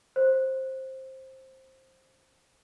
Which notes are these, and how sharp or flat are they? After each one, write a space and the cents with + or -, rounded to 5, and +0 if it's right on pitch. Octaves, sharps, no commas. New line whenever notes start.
C5 +15